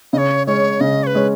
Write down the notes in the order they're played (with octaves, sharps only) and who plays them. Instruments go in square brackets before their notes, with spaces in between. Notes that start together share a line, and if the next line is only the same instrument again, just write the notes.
[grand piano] C#3 [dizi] C#5 D#5
[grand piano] G#3 C#4 [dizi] C#5
[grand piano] C#3 [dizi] D#5
[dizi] C#5
B4
[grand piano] G#3 C#4